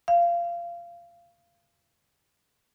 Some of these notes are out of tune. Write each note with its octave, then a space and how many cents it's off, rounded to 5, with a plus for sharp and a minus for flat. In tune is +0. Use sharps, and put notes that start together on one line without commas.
F5 -20